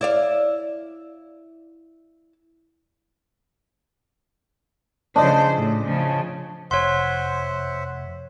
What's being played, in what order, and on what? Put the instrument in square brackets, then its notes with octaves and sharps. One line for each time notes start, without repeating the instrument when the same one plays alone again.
[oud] E4 D5 F5
[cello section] C#3 F3 C5 [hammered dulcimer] D4 D#5
[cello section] A2
C#3 F3
[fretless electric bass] F1 [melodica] C5 E5 F#5 [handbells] C#5 C6